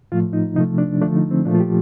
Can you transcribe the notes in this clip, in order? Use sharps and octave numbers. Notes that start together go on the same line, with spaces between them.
A2 F3 A3 F4
D#4
C3 F3 A3 D#4
D4
D3 F3 A3 D4
D#4
C4
A#2 F3 A3 D4
F4
G4